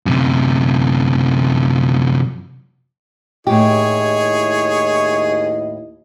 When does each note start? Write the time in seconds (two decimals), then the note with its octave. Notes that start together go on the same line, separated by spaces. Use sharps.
0.06 F#2 C3
3.47 D#2 A2 E4 G4 G#4 C#5 D#5